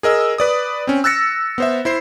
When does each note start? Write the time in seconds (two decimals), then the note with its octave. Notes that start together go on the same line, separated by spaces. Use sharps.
0.03 G#4 A#4 D#5 E6
0.38 B4 D5 D#6
0.87 C4 C#4
1.04 E6 F#6 A6 A#6 C#7
1.58 B3 C5 E5
1.85 E4 C5 C7